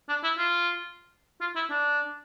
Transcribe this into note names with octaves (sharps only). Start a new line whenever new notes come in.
D4
E4
F4
F4
E4
D4